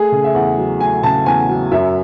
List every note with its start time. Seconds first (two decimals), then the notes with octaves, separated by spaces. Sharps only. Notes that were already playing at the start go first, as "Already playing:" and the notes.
Already playing: A3 G#4
0.12 C#3
0.24 E5
0.35 E2 F#5
0.58 F#3
0.81 A3 G#5
1.03 C#3 A5
1.26 E2 G#5
1.49 F#3
1.72 F#2 E5